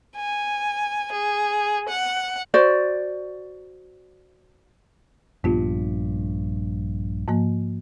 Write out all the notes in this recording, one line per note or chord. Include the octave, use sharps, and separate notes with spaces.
G#5
G#4
F#5
F#4 C5 D5
A#1 G2 B3 F4
G#2 F3 A#3